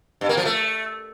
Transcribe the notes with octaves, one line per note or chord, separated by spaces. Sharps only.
G2
A#3
F3
A3